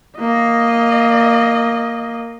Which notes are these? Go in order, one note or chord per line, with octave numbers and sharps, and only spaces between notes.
A#3 D#5